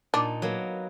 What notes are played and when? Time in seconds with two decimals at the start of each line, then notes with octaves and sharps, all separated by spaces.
0.14 A#2 D4 D#4
0.42 F#3 A#3 B3